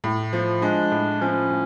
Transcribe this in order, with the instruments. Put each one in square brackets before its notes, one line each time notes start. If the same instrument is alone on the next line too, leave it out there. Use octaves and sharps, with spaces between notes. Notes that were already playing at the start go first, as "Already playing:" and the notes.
[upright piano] A2
F3
[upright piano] G#3 [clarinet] D4
[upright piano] A2
[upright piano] F3 [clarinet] C#4
[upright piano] A2